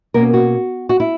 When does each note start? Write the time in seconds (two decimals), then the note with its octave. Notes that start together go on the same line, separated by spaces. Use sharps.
0.14 B2 A#3 C#4 A#4
0.34 F#4
0.89 F#4
1.00 E4